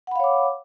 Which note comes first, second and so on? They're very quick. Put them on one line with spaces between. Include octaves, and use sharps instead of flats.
F#5 B5 F5 C#5 D6